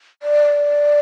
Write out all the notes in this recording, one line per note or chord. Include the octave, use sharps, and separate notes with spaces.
D5